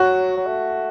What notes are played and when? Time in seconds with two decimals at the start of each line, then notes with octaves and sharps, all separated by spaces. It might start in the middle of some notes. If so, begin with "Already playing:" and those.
Already playing: F#3 F#4
0.37 F#3
0.46 A3